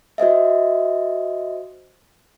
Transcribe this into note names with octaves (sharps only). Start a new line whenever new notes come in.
F#4 C5 D#5 E5